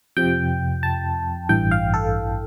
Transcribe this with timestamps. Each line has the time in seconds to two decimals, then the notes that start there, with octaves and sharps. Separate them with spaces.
0.17 F2 C3 F3 G5
0.83 A5
1.49 A1 G2 E3 G5
1.71 F5
1.94 A4